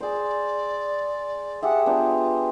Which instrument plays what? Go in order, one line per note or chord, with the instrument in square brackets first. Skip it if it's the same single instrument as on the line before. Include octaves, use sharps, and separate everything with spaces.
[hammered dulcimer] G#4 C5 [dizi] D5
[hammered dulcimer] G4 G#4 E5 [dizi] F#5
[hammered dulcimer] B3 D4 C5 [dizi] F4